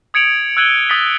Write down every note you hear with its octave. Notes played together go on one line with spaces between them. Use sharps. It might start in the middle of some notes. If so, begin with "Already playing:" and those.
D#6 G#6 C#7 D7 F7 F#7
E6 F#6 G#6 D#7 F#7 G7
D#6 A6 B6 G7